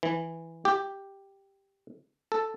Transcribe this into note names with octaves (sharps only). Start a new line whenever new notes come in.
E3
G4
A4